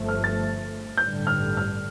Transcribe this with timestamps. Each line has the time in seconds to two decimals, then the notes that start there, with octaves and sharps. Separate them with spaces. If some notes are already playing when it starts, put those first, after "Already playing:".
Already playing: G1 G2 F3 A3
0.09 F6
0.24 A6
0.98 A1 G2 D3 G3 G6
1.27 F6
1.57 F6